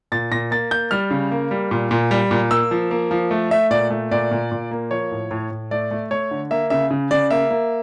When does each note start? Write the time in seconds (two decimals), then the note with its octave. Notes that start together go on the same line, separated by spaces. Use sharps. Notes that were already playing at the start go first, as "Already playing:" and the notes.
0.12 A#2 A6
0.32 A#2 A#6
0.51 A#3 A6
0.71 A#3 G6
0.91 G3 F6
1.11 C#3
1.31 A#3
1.51 G3
1.71 A#2
1.91 A#2
2.11 G3
2.31 A#2
2.51 A#3 E6
2.71 F3
2.91 A#3
3.11 F3
3.31 A3
3.51 A3 E5
3.71 A#2 D5
3.90 A3
4.11 A#2 D5
4.31 A#2
4.52 A#2
4.71 A#3
4.91 F3 C#5
5.11 A2
5.31 A2
5.51 A2
5.71 A3 D5
5.91 A3
6.11 A3 C#5
6.31 D3
6.51 A#3 E5
6.70 C#3 E5
6.91 C#3
7.11 C#3 D5
7.31 A#3 E5
7.50 A#3